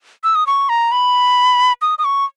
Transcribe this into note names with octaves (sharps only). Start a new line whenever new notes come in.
E6
D#6
C#6
A#5
B5
D#6
D#6
C#6